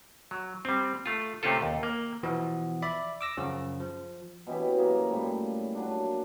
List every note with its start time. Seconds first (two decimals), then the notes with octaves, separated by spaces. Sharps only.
0.31 F#3
0.65 G3 C4
1.06 A3 F4
1.43 C3 A3 C4 C#4 F4 A4
1.62 D#2
1.83 A#3
2.23 B2 E3 F3 B3
2.82 D5 E5 B5
3.21 D6 E6 A#6
3.37 F#2 C#3 F3
3.80 F3
4.47 B2 E3 C#4 G4
4.78 F#2 A#3 G#4 A#5
5.10 A2 F3 G3
5.75 A#2 F#3 D4